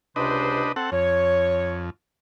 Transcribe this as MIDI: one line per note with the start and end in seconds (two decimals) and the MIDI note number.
0.16 0.69 37
0.16 0.69 48
0.16 0.72 62
0.16 0.72 71
0.16 0.69 72
0.16 0.72 75
0.76 0.90 60
0.76 0.90 69
0.76 0.90 78
0.92 1.90 41
0.92 1.82 73